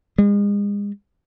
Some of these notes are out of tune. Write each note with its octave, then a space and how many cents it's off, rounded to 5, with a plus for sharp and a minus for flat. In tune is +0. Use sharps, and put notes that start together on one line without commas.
G#3 -35